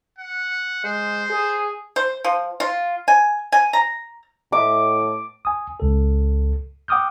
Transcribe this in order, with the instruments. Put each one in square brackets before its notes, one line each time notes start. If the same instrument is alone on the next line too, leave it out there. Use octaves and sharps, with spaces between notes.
[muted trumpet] F#5
[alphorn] G#3 [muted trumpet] C5
[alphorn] G#4
[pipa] C5
F3
F4
G#5
G#5
A#5
[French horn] A2 [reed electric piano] D#5 E5 [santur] D6
[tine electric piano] G#5 D#6
C#2 A4
F#5 G5 D6 D#6 F6 G6